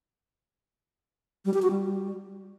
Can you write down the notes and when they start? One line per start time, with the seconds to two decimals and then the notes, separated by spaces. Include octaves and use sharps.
1.45 G3
1.54 G4
1.62 F#4
1.70 G3